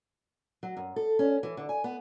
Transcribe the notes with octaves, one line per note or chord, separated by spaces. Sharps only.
F#3
F#2
A4
C#4
E3
D3
G#5
B3